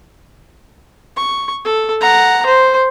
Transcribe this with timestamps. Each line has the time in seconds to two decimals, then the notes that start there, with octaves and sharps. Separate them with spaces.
1.16 C#6
1.64 A4
2.01 F#5 A#5
2.46 C5